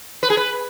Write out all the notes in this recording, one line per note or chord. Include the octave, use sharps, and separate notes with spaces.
B4
G#4
B4